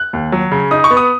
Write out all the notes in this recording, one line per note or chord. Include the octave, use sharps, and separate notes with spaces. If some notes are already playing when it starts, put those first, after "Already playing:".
Already playing: F#6
D#2
F#3
C#3
D#4 D#6
C#6
B3
D#6